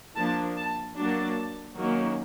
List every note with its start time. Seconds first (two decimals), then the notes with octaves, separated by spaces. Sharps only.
0.16 F3 A#3 D4 A5
0.56 A5
0.96 F#3 A#3 D4 A5
1.77 D#3 F#3 A#3 C#4